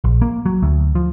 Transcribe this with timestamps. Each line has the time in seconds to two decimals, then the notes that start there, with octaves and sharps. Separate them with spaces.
0.04 A#1
0.21 A#3
0.46 F#3
0.62 D2
0.95 F3